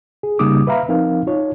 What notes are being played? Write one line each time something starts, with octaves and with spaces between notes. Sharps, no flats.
G#4
C#3 G3 A#3 D#4 D6 D#6
B4 E5 F5 A#5 B5
F3 C4 D#4 A#4 F5
D#4 F4 C#5